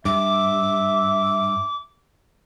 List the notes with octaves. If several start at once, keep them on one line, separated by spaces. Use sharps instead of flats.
G2 E5 D6